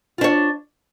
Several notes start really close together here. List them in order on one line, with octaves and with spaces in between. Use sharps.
F4 D4 C#5